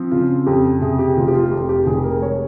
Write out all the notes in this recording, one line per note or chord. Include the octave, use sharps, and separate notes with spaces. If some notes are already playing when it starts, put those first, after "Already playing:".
Already playing: F3 C4
C#3 F4
F2 G4
C3 G#4
G4
F1 F4
G4
F4
F2 G4
G4
F1 G#4
A#4
G#3 C#5